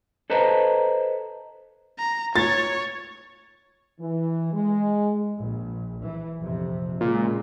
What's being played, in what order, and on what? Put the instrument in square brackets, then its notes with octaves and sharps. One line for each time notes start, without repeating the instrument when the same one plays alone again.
[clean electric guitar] A4 B4 C5 D#5 A5 A#5
[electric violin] A#5
[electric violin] C#5 [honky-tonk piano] A6
[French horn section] E3
G#3
[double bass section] A#1
E3
A#1 F2 C3
[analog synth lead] A#2 [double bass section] C#3 G#3